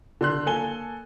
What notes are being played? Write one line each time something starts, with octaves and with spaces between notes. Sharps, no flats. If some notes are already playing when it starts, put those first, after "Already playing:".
D3 C6 F#6
A#3 A4 G#5 G7